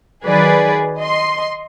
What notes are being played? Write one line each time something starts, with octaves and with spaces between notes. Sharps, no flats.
D#3 F#3 G#4 B4 D5
D#5 C6